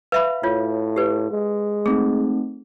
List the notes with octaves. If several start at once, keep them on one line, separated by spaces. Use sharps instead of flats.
B4 E5 F5 B5
A2 F4 C#5
G4 B4
G#3
A3 C4 D#4 G#4